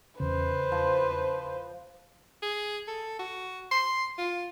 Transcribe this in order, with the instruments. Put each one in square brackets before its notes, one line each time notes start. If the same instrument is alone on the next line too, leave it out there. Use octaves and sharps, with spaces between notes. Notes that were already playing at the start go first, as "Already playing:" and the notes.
[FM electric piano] E2 C#3 [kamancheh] B4 C5
[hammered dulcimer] F3
[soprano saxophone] G#4
A4
F#4
C6
F4